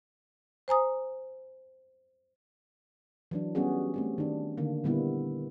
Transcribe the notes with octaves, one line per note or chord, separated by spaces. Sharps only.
C5 G#5 A#5 D#6
E3 F#3 D4
G3 B3 C#4 F#4 G#4
A3 C4 G4
D#3 D4
D3 D#3 A#3
A#2 D3 G3 A#3 B3 E4